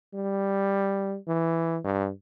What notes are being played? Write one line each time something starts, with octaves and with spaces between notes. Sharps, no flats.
G3
E3
G2